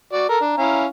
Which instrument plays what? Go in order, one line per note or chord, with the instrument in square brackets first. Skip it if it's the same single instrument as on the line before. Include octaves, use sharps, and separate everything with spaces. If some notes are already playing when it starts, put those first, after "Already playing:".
[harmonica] F#4 D5
[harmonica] A4 A#4 [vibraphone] A#5
[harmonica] D4
C#4 E4 F5